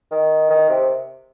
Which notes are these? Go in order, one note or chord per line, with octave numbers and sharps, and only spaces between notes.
D#3
D#3
C3